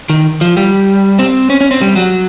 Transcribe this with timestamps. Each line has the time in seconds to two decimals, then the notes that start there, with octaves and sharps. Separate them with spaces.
0.10 D#3
0.41 F3
0.57 G3
1.19 C4
1.50 C#4
1.61 C#4
1.71 C4
1.81 G3
1.96 F#3